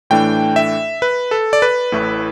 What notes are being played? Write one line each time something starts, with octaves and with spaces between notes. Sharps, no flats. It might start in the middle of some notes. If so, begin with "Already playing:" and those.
A2 E3 A3 D4 G5
E5
B4
A4
D5
B4
A1 A2 A3 E4